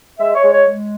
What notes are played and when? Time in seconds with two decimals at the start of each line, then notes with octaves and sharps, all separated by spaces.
0.19 G#3 E5
0.35 C#5
0.44 G#3
0.51 C#5
0.67 G#3